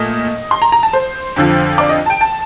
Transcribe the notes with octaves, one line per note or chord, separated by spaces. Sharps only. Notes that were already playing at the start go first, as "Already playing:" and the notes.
Already playing: A#2 A3 D#5
C6
A#5
A#5
A5
C5
F2 D3 F3
D5
D#5
A5
G5
A5